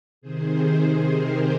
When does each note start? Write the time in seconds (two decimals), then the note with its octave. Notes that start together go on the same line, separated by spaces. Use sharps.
0.21 C3 D#3 G#4 C5
1.13 G4 A#4